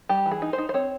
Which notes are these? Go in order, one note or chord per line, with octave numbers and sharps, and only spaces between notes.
G3 G4
E3
G#4
D#4
C5
D#4
C5
C4 C#5